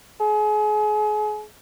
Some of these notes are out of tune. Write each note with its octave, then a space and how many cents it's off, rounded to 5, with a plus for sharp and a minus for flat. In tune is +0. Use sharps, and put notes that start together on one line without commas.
G#4 +35